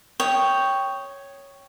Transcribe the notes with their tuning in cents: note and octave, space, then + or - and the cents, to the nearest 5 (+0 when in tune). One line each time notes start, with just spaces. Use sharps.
C#5 +0 G5 +0 D#6 +0